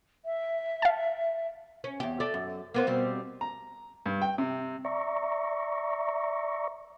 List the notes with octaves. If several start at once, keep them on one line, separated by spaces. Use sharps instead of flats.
E5
F5 A5
C#4
E2 G4
A3 D5
F#2
A#3 B3 C5
B2 G3 C4
A#5
G2
G5
C3
D5 E5 A#5 C#6